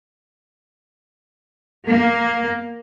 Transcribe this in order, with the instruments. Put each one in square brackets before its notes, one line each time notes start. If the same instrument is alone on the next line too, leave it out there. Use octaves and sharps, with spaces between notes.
[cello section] A#3